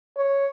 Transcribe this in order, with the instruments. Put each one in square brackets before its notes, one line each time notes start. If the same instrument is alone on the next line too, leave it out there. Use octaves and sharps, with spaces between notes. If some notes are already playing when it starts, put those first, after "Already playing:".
[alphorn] C#5